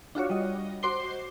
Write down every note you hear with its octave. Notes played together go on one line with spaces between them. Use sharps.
D4 F4 F#4 C#5
G3 D#5
F#4 C5 C6 D6 C7 G7